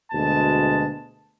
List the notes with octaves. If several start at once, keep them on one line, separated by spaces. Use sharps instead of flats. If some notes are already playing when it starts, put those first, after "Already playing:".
D2 B2 G#3 A5